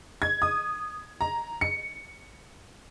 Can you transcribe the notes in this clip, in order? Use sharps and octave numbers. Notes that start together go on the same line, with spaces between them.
G#6
D#6
A#5
C#7